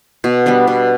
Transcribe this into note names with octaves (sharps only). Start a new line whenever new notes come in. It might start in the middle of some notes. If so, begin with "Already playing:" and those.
B2
G3 B3 D4
B2